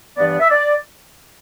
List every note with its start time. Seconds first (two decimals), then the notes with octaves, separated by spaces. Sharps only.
0.17 G2 E3 B3 D5
0.29 D5
0.40 E5
0.51 D5